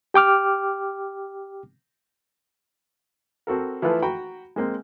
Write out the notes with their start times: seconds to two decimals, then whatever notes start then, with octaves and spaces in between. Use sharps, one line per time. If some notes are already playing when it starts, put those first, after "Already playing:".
0.14 G4 G5 D6 F6
3.47 C4 F#4 A4 A#4
3.82 E3 F3 A3 F4 A4 B4
4.03 F#4 G5 A#5 B5
4.56 G#3 A#3 C4